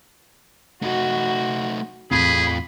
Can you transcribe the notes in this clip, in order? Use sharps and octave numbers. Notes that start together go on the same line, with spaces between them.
A3 D#4 F#4
E2 A2 C4 F4 G#4 A4 B5